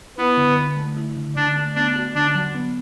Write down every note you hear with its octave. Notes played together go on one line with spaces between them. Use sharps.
B3 E4
D3
D3
A3
E4
D3
D3 D4
A3
B3 D4
F#4
D3 D4
F#3
B3